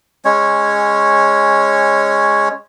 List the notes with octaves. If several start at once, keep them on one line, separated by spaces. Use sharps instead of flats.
G#3 C#4 C#5